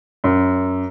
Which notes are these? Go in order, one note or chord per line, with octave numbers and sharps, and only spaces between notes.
F#2